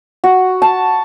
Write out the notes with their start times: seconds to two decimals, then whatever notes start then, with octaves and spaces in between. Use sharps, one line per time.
0.24 F#4
0.62 A5